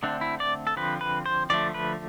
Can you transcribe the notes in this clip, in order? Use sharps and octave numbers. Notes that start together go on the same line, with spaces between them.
D3 A3 C4 D4
E4
D5
A4
D3 F3 C4 B4
B4
C5
D3 F3 A3 D5
B4